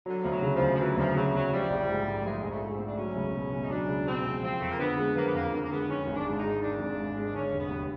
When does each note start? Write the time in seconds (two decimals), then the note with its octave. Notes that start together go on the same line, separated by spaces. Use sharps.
0.06 D3 F#3
0.22 D2 F3
0.31 F#3
0.42 C#3
0.55 F3
0.61 D2
0.74 F3
0.79 E3 F#3
0.97 D2 F3
1.15 C#3 F#3
1.34 D2 F#3
1.52 F3 G3
1.70 A#1
1.88 G#2
2.07 A3
2.25 F3 G#3
2.41 A#1 G#3
2.49 A3
2.61 G#2
2.73 C4
2.79 A3
2.86 D4
2.97 F#3 C#4
3.16 C#2
3.34 B2
3.52 C#2
3.62 D#4
3.70 F#3 D4
3.88 C#2
4.06 B2 C4
4.25 C#2
4.42 F3 C4
4.59 F2 A3
4.69 A#3
4.79 D3 B3
4.98 G#3
5.16 F3 A#3
5.27 B3
5.34 F2 A#3
5.53 D3 A#3
5.63 A#3
5.70 G#3 B3
5.89 D#3 C#4
6.07 G#1
6.13 D4
6.25 G#2
6.37 D#4
6.43 G#3
6.61 D#3 D4
6.79 G#1
6.98 G#2
7.16 G#3
7.34 D3 C#4
7.52 F1
7.58 B3
7.71 D#2